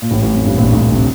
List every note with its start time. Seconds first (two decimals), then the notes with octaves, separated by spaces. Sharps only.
0.02 A#2
0.11 A1 A2
0.22 A1 A2
0.34 F2
0.45 G2
0.57 A#1 A#2
0.73 D2 D3
0.92 C3